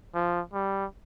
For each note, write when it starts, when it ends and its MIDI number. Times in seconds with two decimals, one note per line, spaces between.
0.15 0.41 53
0.54 0.85 55